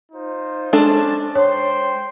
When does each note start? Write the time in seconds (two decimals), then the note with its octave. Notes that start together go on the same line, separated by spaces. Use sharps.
0.12 D#4 F4 C5
0.73 G#3 C#4 D4 A4 C5 A5
1.35 C5 C#5 G5 C6